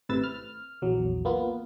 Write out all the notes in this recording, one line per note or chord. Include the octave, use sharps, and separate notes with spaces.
G#1 A2 C3 B4 E6 A6
F6
A#1 E2 F#3
A#3 B3 F4